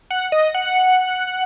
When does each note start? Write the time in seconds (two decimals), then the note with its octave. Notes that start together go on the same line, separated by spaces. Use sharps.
0.10 F#5
0.32 D#5
0.54 F#5